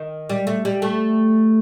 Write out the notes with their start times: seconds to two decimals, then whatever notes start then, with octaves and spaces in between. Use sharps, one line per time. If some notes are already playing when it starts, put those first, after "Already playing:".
Already playing: D#3
0.29 G3
0.47 A3
0.65 G3
0.82 A3